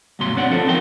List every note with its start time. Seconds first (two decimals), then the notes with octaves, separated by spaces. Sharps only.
0.19 D2 G2 B2 F#3 C6
0.36 C4 D4 C#5 D5 F#5
0.50 F3 F4 A4 C5
0.66 B3 C4 D#4 A#4 G5